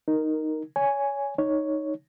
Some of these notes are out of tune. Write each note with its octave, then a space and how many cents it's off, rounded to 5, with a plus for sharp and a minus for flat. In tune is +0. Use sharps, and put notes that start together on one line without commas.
D#4 +0 A#4 +0
C#5 +20 G#5 +0
D#4 +0 C#5 +0